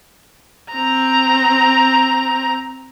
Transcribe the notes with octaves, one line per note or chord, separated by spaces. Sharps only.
C4 A#5